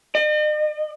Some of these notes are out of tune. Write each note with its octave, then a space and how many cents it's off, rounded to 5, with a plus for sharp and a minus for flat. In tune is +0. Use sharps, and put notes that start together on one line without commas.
D#5 -45